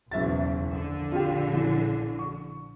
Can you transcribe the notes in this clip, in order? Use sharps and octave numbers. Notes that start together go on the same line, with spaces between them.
F#1 B1 E2 E5 A6
A#1 D3
F4 G4
E3
C#6